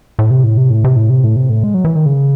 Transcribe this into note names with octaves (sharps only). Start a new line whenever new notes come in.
A2
C3
A2
C3
A2
C3
A2
C3
A2
C3
A2
G#3
F#3
E3
D#3
C#3